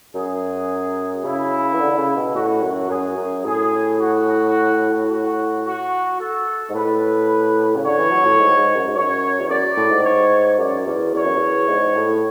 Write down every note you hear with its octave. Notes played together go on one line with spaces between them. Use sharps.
F#2 G#4
C#3 E4
E3
D3
D3
C#3
B2
A2 F#4
F#2
F#2 G#4
F#2
A2 G#4
F#4
F#4
F#4
A4
G#2
A2 B4
C#3
D3 C#5
E3
F#3
A2
G#2
G#2
F#2
G#2
F#2 C#5
E2
F#2 D5
A2
G#2
C#5
F#2 D5
E2
E2 C#5
F#2
E2
G#2
A2